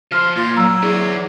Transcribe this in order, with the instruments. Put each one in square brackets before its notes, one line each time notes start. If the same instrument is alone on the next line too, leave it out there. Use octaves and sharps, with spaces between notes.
[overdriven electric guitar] F3 C5 [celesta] F6
[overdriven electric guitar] A#2 [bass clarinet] F4
[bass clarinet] F#3 [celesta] A#5 E6
[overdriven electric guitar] E3 D5 [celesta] G#4